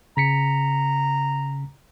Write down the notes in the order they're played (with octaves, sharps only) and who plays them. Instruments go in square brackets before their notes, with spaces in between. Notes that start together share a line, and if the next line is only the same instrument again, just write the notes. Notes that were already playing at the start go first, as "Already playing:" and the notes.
[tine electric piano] C#3 B6 C#7 [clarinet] A#5